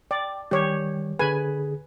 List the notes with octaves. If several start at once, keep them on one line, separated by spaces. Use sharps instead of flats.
D5 G5
D#3 G3 G4 C#5
D3 G#4 B4 G#5